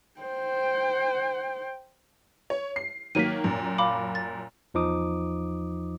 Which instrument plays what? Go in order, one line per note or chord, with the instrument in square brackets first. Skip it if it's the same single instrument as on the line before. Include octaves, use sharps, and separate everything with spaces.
[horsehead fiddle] C5 G5
[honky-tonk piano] C#5
C7
[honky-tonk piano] D#3 F#3 A#3 [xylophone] B6 D#7
[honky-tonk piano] F#2 A#2
[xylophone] F5 B5 D6
A6
[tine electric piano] E2 F3 D#4 D6 D#6